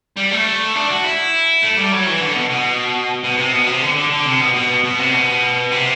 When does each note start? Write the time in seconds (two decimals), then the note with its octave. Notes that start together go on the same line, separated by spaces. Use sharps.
0.17 G3
0.31 A3
0.75 D4
0.90 F#4
1.04 E4
1.63 A3
1.77 G3
1.92 F#3
2.07 E3
2.21 D3
2.36 B2
2.50 B2
3.24 B2
3.37 C3
3.53 B2
3.67 C3
3.82 D3
3.96 D3
4.10 D3
4.25 C3
4.40 B2
4.54 B2
4.84 B2
4.99 C3
5.14 B2
5.72 C3